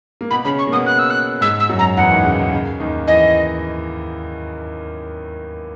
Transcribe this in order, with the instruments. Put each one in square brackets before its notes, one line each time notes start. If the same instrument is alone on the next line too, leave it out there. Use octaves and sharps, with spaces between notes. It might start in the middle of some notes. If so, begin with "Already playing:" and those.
[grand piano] A#3
[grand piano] B2 B3 [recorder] B5
[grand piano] C#3 C#4 [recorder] B5
[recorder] C#6
[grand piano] A#3
[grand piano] B2 B3 [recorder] D#6
[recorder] F#6
E6
F#6
[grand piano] G#2 G#3 [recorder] E6
[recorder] E6
[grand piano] F#2 F#3
[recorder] A#5
[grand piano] E2 E3 [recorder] F#5
[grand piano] D#2 D#3
C#3
B2
C#3
D#2 D#3
[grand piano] E3 [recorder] D#5